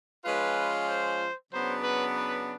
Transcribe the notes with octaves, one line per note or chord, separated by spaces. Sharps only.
F3 G#3 C#4 F4 B4
C5
C#3 F#3 B3 D4 C5
B4
B4